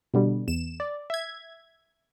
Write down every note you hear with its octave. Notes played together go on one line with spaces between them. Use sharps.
B2 D3 G3
E2 E7
D5
E5 G#6